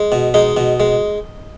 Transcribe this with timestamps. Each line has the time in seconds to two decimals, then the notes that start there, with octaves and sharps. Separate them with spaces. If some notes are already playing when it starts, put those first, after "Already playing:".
Already playing: G#3
0.12 B2
0.34 G#3 D#4
0.57 B2
0.80 G#3